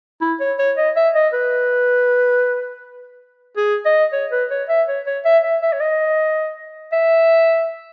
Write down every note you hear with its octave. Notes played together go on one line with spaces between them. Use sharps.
E4
C#5
C#5
D#5
E5
D#5
B4
G#4
D#5
C#5
B4
C#5
E5
C#5
C#5
E5
E5
E5
C#5
D#5
E5